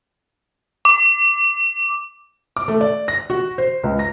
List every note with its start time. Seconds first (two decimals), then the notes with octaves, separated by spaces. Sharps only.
0.85 D6
2.56 D6
2.68 A3
2.81 D5
3.08 A#6
3.30 F#4
3.58 C5
3.83 C#2
3.99 A#6